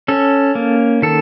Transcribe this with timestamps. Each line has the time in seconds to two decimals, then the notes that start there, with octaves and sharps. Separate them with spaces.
0.08 C#4 A4
0.55 A#3
1.02 D#3 A4